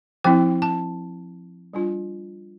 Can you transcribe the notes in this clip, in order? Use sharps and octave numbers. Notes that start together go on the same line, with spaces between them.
F3 C4 E4 G5
A5
G3 D4 F4